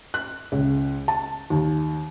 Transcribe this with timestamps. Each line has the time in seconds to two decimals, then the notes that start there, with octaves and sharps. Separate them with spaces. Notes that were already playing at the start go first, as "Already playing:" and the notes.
0.14 F#6
0.52 C#2
1.08 A5
1.50 D#2